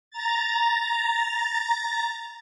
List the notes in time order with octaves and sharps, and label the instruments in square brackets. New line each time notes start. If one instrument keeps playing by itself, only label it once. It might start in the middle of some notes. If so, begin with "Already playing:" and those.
[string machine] A#5 A6